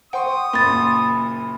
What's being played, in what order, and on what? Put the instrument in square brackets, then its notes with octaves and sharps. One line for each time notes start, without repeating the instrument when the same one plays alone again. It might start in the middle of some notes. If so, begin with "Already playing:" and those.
[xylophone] C5 F#5 [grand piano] G5 C6 C#6 [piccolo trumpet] D#6
[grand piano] F#1 A#2 [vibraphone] B5 [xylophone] C6 A6